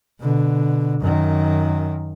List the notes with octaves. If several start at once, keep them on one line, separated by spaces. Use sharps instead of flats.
B2 D3
F#2 D#3